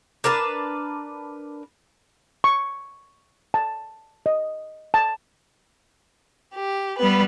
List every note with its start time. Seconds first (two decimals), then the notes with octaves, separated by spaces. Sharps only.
0.24 D4 A#4 B4 A5
2.44 C#6
3.54 A5
4.26 D#5
4.94 A5
6.54 G4
6.98 G3 B3 B4